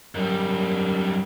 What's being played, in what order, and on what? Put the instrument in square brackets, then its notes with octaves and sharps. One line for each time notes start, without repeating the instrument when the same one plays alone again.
[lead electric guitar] F#2 G3